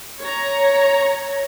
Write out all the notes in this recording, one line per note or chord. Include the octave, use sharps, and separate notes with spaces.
C#5 A#5